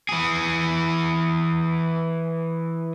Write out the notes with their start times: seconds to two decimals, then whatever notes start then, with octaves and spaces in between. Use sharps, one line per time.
0.09 E3 G#4